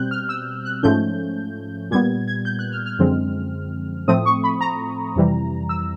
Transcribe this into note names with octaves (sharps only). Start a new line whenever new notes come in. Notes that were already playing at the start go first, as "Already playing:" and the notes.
Already playing: B2 G3 C4 F#6 G6
F6
E6
F#6
G#2 F3 A3 C#4 G6
A#2 G3 B3 G#6
G#6
G6
F#6
F6
F6
F#2 D3 F3 G#3 C4
A2 F3 A3 C4 D#6
C#6
B5
A#5
F2 C3 E3 G3
E6